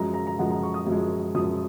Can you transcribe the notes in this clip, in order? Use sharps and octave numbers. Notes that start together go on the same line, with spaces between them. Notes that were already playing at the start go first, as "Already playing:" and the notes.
Already playing: F#2 F3 G#3 A#5
A#5
A#5
F#2 F3 G#3 F#5
A#5
C#6
D#6
F#2 F3 G#3
F#2 F3 G#3 D#6